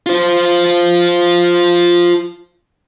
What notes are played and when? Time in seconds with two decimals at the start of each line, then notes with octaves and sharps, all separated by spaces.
0.06 F4 C5